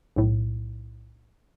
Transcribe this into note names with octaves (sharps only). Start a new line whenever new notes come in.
B1 A2